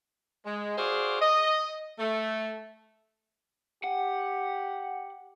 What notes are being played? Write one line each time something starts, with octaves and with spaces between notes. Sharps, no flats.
G#3
F#4 G#4 C5 D5 F5
D#5
A3
G4 F#5